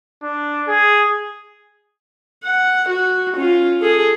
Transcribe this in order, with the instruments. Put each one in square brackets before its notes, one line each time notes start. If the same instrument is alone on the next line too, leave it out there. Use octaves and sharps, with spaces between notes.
[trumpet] D4
G#4
[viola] F#5
F#4
C#4 F4
G#4 A4